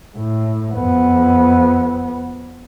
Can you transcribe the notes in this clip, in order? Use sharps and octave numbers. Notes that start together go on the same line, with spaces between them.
A2
F2 B3